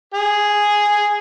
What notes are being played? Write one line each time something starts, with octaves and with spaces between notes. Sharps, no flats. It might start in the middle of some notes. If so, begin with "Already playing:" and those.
G#4